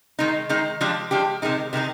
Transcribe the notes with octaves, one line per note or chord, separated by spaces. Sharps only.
D#3 G#3 D#4
D#3 G#3 D#4
F3 G#3 D4 G4
F3 G#3 D4 G4
C3 D#3 G#3 D#4
C3 D#3 G#3 D#4